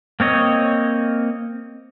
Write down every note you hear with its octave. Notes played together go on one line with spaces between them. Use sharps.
A#3 C4 C#5 D#5